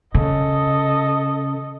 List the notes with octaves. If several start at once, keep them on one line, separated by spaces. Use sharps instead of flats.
C#3 A4 D#5